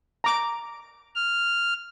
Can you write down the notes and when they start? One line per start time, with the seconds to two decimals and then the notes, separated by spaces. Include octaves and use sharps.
0.24 A#5 D6
1.15 F6